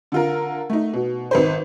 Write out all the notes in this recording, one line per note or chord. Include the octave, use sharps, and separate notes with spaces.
D3 F4 A#4
A3 D#4
B2
G#1 B4 C5